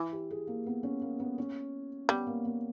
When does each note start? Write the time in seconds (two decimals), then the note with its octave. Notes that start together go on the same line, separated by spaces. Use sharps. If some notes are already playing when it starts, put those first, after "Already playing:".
Already playing: E3 E4
0.12 G4
0.31 G#4
0.47 A#3
0.66 B3
0.83 C#4
1.02 A#3
1.20 B3
1.38 C#4
2.09 G3 B3
2.27 A#3
2.45 B3